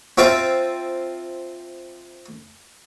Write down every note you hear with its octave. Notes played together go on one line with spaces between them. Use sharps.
C4 F4 E5 G5 A5